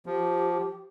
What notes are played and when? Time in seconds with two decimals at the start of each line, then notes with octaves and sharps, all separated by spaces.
0.06 F3 G4